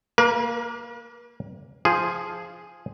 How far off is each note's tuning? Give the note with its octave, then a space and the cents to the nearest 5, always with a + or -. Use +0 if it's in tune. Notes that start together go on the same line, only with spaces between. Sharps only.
A#3 +0 A#4 +45
F3 -5 G#4 +0